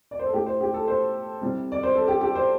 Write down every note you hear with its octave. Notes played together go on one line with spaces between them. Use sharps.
D5
C5
A4
A2 A3 G4
C5
G4
A4
C5
C2 C3 G3
D5
C5
A4
G4
G4
C5